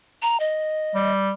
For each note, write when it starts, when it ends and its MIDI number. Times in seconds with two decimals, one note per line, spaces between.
0.22 0.39 82
0.40 1.12 75
0.95 1.31 55